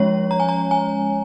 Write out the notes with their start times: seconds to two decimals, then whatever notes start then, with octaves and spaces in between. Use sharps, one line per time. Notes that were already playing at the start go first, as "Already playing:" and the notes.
Already playing: F3 G#3 C#4 C#5
0.31 A#5
0.40 G#5
0.49 A#5
0.71 G#5